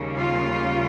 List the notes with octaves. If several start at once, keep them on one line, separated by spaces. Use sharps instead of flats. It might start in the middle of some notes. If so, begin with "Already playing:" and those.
Already playing: D#2 C#3 G3 A#3
F4